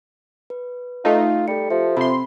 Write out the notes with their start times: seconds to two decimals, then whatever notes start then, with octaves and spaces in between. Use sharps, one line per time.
0.50 B4
1.05 A3 D#4 F4
1.48 G3 A4 C#7
1.70 F3 G4 A4 E5
1.97 C3 B5 C6